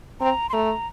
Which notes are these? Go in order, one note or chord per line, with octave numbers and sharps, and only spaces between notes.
C4 A#5
C6
A3 A#5